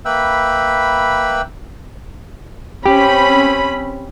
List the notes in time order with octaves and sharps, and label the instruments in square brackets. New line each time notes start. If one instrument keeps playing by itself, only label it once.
[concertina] A#3 B4 E5 G5 B5 E6
[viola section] C4 C#4 B5 [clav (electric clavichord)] G4